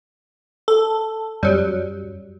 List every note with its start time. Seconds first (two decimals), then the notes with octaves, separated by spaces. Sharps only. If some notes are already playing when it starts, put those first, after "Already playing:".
0.68 A4
1.43 F#2 F#3 G3